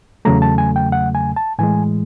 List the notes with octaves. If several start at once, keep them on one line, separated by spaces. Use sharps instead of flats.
E2 C#3 F#3 A3 A#5
A5
G#5
G5
F#5
G#5
A5
A2 E3 G#3 G#5